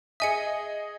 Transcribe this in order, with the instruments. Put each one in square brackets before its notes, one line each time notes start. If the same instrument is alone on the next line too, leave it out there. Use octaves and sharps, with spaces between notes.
[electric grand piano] G#4 D#5 D#6 [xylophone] E5 G#5 C#7